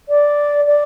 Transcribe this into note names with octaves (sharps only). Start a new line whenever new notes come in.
D5
D5